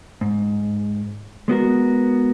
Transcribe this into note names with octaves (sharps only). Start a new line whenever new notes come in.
G#2
G#3 B3 F#4 A#4